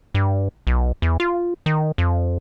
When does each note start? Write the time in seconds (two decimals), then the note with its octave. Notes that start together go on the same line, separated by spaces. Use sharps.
0.15 G2
0.67 B1
1.02 E2
1.20 F4
1.66 D#3
1.98 F2